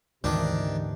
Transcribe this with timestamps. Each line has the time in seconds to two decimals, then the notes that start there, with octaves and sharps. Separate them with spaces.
0.24 D2 G#2 C3 D#3 E3 D4